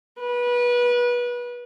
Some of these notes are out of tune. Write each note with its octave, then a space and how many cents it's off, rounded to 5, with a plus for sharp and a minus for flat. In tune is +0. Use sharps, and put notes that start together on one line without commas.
B4 -25